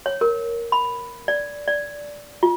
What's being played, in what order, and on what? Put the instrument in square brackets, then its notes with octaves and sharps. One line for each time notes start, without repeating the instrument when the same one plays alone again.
[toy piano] C#5
A#4
B5
D5
D5
F4